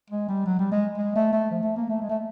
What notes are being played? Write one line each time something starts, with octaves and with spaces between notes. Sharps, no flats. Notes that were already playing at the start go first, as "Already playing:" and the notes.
G#3
G3
F#3
G3
G#3
G#3
A3
A3
F3
A3
A#3
A3
G#3
A3